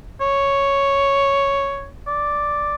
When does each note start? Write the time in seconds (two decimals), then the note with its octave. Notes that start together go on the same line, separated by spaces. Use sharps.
0.21 C#5
2.07 D5